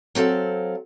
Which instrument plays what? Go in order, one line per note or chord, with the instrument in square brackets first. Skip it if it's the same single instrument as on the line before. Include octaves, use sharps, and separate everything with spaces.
[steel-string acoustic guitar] F#3 C4 A4 F5